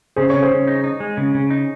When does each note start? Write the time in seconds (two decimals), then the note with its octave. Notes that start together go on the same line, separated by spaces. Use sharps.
0.16 C#3 G#4 C5
0.30 C#3 C#5
0.42 G#4 C5
0.51 C#3
0.67 D#4
0.84 D#4
1.00 G#3
1.17 C#3
1.35 C#3
1.50 D#4